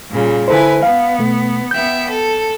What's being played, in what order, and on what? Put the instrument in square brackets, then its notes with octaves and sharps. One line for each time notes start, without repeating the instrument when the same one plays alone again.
[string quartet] A#2 C#3 G3
[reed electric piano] D3 A4 C5 [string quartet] E4 B4 G#5
[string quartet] B3 [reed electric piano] F5
[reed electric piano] B2 A3
[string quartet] B3 E5 G5 [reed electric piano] G6
[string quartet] A4